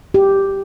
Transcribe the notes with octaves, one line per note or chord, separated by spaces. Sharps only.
G4